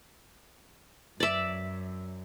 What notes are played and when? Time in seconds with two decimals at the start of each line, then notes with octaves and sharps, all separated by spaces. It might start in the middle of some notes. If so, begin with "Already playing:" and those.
1.20 F#2 D5 E5